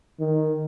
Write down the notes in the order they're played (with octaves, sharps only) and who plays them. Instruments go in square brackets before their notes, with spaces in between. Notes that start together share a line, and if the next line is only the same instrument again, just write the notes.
[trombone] D#3